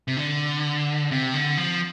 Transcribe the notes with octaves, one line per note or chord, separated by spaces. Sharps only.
C3
D3
C3
D3
F3